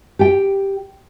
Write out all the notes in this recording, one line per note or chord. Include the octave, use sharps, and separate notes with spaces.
G4 G5